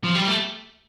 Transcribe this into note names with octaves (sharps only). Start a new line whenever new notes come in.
F3
G3
A3